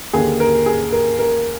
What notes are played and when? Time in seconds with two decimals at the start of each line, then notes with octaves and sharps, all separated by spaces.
0.13 D#2 D3 G#4
0.40 A#4
0.66 G#4
0.92 A#4
1.19 A#4